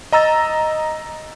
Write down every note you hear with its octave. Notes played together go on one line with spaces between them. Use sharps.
D#5 A#5 E6 A6